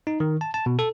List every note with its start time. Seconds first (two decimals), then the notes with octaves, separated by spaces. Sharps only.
0.07 D#4
0.20 D#3
0.41 A5
0.54 A5
0.66 B2
0.79 A4